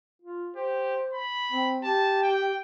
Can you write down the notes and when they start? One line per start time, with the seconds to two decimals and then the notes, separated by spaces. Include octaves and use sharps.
0.22 F4
0.56 G4 C5
1.13 B5
1.52 C4
1.84 G4 A5
2.23 G5